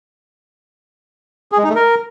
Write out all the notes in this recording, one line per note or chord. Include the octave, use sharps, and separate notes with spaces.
G#4
G#3
D#4
A3
A#4